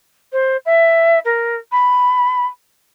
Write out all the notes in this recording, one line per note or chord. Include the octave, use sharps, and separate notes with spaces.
C5
E5
A#4
B5